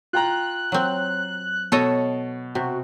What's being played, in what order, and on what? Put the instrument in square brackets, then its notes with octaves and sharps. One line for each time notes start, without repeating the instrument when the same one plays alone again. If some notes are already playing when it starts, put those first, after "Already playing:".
[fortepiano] F4 G5 A#5 [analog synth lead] F#6
[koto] F#3 C4
[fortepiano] B2 [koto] A4 C#5 D#5
[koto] C3 [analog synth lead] F#4